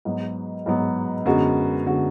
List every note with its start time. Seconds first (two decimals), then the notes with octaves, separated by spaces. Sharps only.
0.05 G#2 F#3 B3
0.66 G#2 F#3 B3
1.26 F#2 D3 G#3 B3 F#4
1.85 F#2 D3 G#3 B3 F#4